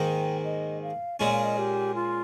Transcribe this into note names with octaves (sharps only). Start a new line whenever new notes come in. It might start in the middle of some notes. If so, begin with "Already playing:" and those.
Already playing: G#2 D#3 A#3 D#4 G5
D#5
F5
A#2 G#3 C#4 D#5
F5
D#5
G4
F4